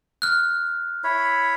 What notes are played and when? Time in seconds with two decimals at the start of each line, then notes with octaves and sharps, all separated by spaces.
0.22 F6 F#6
1.04 E4 C#5 B5